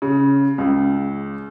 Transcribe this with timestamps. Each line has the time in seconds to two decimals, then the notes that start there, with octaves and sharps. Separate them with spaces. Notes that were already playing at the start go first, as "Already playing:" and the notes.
0.02 C#3
0.58 C#2